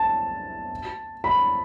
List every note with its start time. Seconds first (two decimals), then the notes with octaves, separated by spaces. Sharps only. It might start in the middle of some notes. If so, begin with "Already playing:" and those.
Already playing: A5
1.24 B5